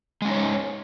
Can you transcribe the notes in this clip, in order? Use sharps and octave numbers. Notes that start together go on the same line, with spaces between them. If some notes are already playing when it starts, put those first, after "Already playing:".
G#3 C#4 D#4 C#5